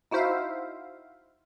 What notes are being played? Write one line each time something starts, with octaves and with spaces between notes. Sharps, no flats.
D#4 E4 F#4 C5 E5 F5